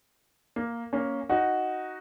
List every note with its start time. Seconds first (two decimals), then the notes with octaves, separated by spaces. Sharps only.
0.56 A#3
0.93 A#3 C#4
1.29 D#4 F#4